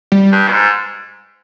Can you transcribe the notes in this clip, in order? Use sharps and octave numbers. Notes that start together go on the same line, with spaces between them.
G3
G2
B2
G#2